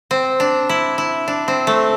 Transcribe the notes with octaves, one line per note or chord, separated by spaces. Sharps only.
C4
D4
E4
E4
D4
C4
A3